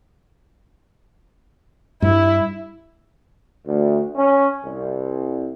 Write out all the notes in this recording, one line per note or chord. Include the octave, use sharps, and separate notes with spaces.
G2 E4
D2
C#4
C2